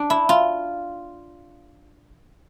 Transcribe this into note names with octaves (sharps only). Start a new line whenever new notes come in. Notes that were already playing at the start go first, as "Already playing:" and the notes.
Already playing: D4
E4
F4